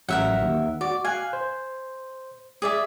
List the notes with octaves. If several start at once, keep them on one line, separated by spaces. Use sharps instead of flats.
A1 F#3 A#4 E5 F#5
D#2
F#4 D5
F5 G#5 F#6
C5
G#4 D5 E5